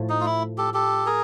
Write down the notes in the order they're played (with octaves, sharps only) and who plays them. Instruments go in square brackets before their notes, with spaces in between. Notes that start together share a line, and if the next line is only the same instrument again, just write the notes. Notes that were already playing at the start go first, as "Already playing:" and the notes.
Already playing: [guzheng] A2 F3 A3
[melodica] D#4
F4
E4
G4 A4
G4 A4
G#4 A#4